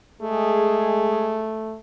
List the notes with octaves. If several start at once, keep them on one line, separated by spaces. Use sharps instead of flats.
G#3 A3 G#4